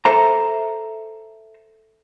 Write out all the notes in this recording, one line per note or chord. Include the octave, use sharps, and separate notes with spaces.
A4 C5 E5 A#5